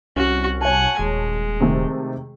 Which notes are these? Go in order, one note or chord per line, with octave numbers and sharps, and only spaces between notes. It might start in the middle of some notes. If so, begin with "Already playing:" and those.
C2 C#4 F#4
C#5 F#5 G#5 A5
D#1 G#3
C3 D#3 A3